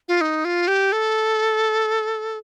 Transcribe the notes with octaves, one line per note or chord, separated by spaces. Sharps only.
F4
D#4
F4
G4
A4